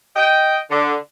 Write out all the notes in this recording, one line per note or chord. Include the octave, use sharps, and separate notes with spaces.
D#5 G5
D3